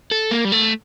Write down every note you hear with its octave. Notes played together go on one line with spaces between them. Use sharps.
A4
A#3
G3
A3